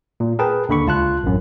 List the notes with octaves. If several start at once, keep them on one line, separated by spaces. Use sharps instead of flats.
A#2
G#4 A#4 B4 G5 A5
D#2 D3 B5 C#6
C#2 F4 A5 F#6
A1 F#2